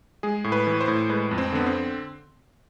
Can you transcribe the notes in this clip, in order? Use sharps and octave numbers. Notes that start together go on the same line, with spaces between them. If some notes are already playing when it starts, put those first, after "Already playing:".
G#3 G#4
A2
B4
E3
C5
A2
G#3 B4
F2
C4
D3 B3
C4